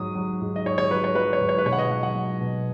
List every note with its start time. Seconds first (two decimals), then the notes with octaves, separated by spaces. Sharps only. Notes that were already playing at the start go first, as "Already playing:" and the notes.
Already playing: G#2 F#3 D#6
0.15 F#3
0.41 G#2
0.56 D#5
0.65 G#2 C#5
0.78 C#5
0.90 F#3 B4
1.04 C#5
1.15 F#3 B4
1.33 C#5
1.41 G#2
1.49 C#5
1.58 B4
1.65 B2 C#5
1.73 F#5
1.79 D#5
1.91 F#3 F#5
2.03 F#5
2.15 F#3
2.41 B2